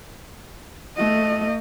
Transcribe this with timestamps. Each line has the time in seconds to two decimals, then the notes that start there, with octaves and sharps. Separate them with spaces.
0.96 A3 D#5